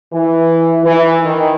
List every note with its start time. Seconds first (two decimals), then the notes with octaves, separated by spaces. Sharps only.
0.12 E3
0.84 E3
1.23 D#3